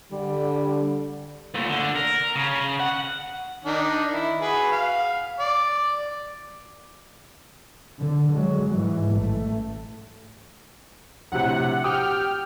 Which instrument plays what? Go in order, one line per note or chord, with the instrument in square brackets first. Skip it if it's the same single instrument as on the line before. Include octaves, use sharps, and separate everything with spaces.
[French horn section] D3 [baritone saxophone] G3
[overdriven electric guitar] A#2 A3
D3
A#4
C#3
F#5
[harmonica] D#3 D4 D#4
E4
F#4 G#4 B4
F5
D5
[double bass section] D3
F#3 G#3
G#2 E3
A1 A3
[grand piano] A#1 A2 C3 [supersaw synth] F#5
[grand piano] G4 D6 D#6 [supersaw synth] G5 F6